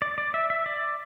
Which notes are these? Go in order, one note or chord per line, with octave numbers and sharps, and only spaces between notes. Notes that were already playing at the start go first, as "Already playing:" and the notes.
D5
D5
E5
E5
D5